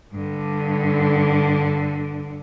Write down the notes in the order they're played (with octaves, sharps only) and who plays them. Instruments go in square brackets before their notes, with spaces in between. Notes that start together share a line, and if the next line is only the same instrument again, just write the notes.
[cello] G2 D3